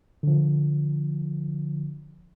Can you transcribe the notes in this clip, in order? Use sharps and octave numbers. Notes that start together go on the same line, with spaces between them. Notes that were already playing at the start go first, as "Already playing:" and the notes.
D3 F3